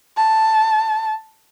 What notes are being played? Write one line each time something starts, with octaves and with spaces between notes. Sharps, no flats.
A5